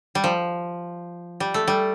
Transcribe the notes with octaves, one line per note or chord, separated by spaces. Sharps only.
G3
F3
G3
A3
G3